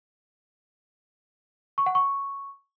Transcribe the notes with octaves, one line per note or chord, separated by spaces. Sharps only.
C#6
F#5
C#6